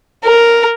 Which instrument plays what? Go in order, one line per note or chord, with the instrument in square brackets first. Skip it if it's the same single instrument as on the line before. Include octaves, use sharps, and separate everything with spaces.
[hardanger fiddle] A#4